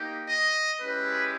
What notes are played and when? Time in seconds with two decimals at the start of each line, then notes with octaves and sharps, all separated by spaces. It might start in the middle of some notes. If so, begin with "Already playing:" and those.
Already playing: A#3 D#4 G4
0.29 D#5
0.80 G#3 C#4 E4 G4 B4